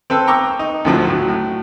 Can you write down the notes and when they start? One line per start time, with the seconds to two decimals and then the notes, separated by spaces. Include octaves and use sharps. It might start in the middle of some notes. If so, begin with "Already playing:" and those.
0.10 C4 A4 B4
0.27 G5 A#5 C#6 D6 E6
0.59 D#4
0.85 D2 A2 D3 F3 F#3
1.07 A2 F#3
1.28 A2